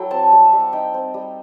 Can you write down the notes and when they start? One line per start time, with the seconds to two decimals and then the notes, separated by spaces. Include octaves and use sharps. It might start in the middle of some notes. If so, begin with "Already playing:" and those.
Already playing: F#3 E4 A4 G5
0.11 C4 A5
0.32 G3
0.45 E5
0.53 G3
0.60 F#5
0.73 D#4 G5
0.94 C4
1.14 G3